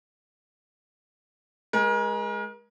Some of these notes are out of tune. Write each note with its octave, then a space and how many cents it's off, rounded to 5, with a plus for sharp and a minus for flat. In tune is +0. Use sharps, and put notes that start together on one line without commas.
G#3 +0 A#4 +35